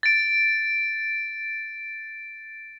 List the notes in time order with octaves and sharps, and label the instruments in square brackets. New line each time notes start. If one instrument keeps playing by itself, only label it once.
[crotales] A6 D7